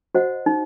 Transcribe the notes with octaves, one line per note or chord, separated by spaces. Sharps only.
F#4 C5 D#5 F#5
D#4